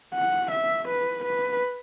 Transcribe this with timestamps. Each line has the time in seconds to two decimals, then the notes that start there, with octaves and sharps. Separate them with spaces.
0.14 F#5
0.52 E5
0.88 B4
1.25 B4